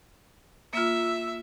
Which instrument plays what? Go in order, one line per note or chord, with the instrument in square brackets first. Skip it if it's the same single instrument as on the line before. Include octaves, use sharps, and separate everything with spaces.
[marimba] A#3 F4 [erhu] E5